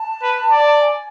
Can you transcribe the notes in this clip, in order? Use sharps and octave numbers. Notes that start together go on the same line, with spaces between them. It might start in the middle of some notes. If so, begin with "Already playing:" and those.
Already playing: A5
B4
D5
G#5